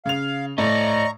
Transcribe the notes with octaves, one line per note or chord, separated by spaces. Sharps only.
C#3 F5 F7
A2 D5 D#5 A#5 C#6